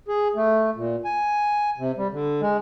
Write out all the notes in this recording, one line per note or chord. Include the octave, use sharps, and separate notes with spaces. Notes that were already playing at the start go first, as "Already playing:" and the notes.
G#4
A3
A#2
G#5
C3
G3
D3
G#3